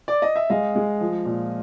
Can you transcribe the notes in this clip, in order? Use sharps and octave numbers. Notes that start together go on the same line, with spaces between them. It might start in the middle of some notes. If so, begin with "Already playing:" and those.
D5
D#5
E5
G#3 D#5 F5
G#3
F3
A#2